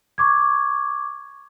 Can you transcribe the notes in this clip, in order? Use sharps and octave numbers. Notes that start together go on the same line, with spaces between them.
C#6 D6 G#6